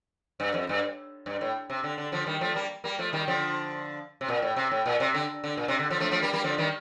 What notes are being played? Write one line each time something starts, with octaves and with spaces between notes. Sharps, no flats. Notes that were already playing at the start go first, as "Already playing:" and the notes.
G2
F2
G2
G2
A2
C3
D3
D3
D3 F3
D#3 G3
F3 A3
G3 A#3
G3 A#3
F3 A3
D#3 G3
D3 F3
C3
A#2
A2
C3
A2
A#2
C3
D3
D3
A#2
C3
D3
D3 F3
F3 A3
F3 A3
G3 A#3
G3 A#3
D3 F3
D#3 G3